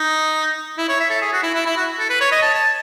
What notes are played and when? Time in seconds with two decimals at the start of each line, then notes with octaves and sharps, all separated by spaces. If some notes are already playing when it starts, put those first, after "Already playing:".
Already playing: D#4
0.78 E4
0.89 C#5
1.00 E5
1.11 A4
1.22 G#4
1.33 F#4
1.43 E4
1.54 E4
1.66 E4
1.77 F#4
1.99 A4
2.10 B4
2.21 C#5
2.32 D#5
2.42 A5
2.54 A5